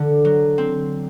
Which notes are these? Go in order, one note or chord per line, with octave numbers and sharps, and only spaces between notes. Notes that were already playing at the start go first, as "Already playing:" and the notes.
Already playing: D3
F#3
C4